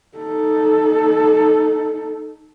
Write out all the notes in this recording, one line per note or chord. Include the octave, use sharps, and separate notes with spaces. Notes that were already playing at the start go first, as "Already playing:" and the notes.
D#4 A4